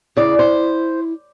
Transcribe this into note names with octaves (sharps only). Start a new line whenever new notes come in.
C#3 E4 D5
C5